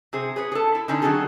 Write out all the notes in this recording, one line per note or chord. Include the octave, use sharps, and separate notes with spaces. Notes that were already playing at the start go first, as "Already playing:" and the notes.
C3 G#4 C5
G#4 B4 C#5
G#4 A4
E4
D3 C#4 D#4 D5
D#3 F#3 G#3 C#4 G#4 A4